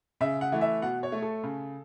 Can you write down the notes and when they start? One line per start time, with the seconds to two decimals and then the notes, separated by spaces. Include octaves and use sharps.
0.21 C#3 E5
0.41 F#5
0.52 E3 A3
0.61 E5
0.82 B2 F#5
1.03 C#5
1.12 A3
1.22 A4
1.43 C#3